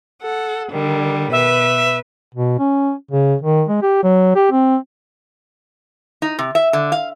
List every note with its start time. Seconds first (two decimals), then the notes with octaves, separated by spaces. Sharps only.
0.22 A4 F#5
0.70 D3 D#3 G3
1.32 B2 B4 E5
2.35 B2
2.59 C#4
3.11 C#3
3.41 D#3
3.69 G#3
3.82 G4
4.03 F#3
4.36 G4
4.51 C4
6.22 D#4
6.39 C3
6.55 E5
6.73 D3
6.92 F5